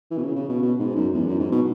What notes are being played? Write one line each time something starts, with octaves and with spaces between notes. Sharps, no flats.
E3
B2
C#3
C#3
B2
B2
G#2
F#2
E2
F#2
G#2
B2